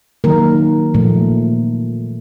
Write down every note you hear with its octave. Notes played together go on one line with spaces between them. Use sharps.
D#3 F#3 A#3 A#4
A#2 F3 A3